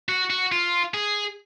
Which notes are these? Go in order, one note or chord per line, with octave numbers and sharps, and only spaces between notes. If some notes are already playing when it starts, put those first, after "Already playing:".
F#4
F#4
F4
G#4